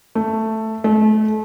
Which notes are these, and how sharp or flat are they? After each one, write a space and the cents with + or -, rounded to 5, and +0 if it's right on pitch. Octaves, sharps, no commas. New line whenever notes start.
A3 +5
A3 -30